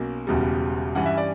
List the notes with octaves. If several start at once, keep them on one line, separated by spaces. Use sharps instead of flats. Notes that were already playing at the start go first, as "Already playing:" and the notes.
Already playing: B1 B2 A#3 C#4
E1 E2 C#3 G3
G2 E3 G3 C#4 F#5
E5
D5